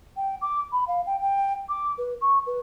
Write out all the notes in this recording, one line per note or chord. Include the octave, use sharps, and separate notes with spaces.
G5
D6
B5
F5
G5
G5
D6
B4
C#6
B4